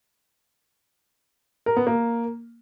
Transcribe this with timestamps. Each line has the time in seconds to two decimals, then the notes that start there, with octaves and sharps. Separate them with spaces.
1.66 A#4
1.76 B3
1.87 A#3